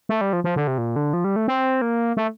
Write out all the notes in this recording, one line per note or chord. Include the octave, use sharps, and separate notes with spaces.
A3
G3
F3
F3
D3
C3
A#2
D3
F3
G3
A3
C4
A#3
A3